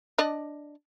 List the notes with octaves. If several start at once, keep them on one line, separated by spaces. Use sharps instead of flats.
D4 D5 D#5